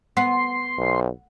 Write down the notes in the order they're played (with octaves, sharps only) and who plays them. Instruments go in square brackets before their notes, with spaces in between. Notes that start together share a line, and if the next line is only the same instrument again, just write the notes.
[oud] B3 [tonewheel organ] C6
[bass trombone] B1